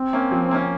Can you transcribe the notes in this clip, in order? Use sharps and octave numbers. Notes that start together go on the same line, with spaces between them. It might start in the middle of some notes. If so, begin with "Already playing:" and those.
Already playing: C4
A#3 C#4
F3
A#3 C#4